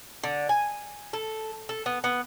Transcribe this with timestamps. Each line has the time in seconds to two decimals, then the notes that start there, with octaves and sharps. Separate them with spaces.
0.23 D3
0.49 G#5
1.13 A4
1.69 A4
1.86 B3
2.04 B3